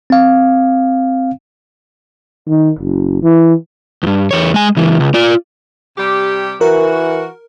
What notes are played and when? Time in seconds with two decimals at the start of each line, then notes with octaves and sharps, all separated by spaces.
0.10 C4 F5
2.48 D#3
2.79 F#1
3.22 E3
4.03 E2 G2
4.31 E2 C#5
4.54 G#3 G#5
4.77 C#2 E3
5.00 C#2
5.14 F4 D5
5.98 C3 G3 G4
6.61 E3 F#4 A#4